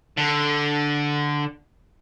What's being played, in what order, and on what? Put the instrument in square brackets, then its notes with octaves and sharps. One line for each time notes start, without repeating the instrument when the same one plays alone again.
[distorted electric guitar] D3